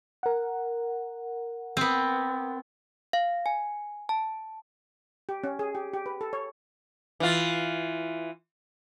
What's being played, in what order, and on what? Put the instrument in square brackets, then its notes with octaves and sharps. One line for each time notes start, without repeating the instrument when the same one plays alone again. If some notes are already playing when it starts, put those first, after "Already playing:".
[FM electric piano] A#4 F#5
[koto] B3 C4
[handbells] F5
G#5
A5
[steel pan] G4
C#4
G#4
G4
G4
B4
A4
C#5
[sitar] E3 F4